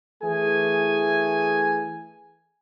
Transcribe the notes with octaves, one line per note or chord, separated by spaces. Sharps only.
E3 A3 G#4 G#5